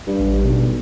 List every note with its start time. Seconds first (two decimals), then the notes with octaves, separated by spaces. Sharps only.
0.07 G2
0.19 A1 G3
0.45 B1 B2